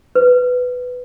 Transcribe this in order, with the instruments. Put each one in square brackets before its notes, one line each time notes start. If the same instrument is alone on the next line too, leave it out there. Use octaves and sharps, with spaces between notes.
[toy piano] B4